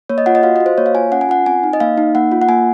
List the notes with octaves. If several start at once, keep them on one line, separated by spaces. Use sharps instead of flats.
A#3 C#5
D#5
F4 F#5
D#5
F#4 F5
F#4 D#5
C5
A#3 C#5
F5
F4 G#5
C#4 F#5
G#5
F4 F#5
C4 G#5
D#4
D#5
A#3 F5
D#4
A#3 F#5
F4
F#5
A#3 G#5